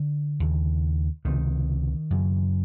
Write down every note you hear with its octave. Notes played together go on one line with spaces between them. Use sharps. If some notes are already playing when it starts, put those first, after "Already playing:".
Already playing: D3
D#2 C#3
C#2 C3 D#3
F#2 C#3